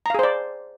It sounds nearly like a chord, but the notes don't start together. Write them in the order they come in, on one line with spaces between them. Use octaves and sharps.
A#5 F5 G#4 C5 D5